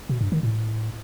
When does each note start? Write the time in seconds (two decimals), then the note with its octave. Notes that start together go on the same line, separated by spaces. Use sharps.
0.09 B2
0.21 G2
0.32 D#3
0.43 A2